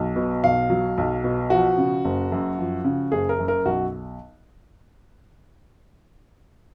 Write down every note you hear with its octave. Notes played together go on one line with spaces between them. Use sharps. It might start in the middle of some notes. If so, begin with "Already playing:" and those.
Already playing: B1 F#3
B2
B1 F5
F#3
B1
B2
F3 F#4
C#3
F#1
F#2
F3
C#3
F#1 G#4
A#4
F#2
A#4
B1 F#4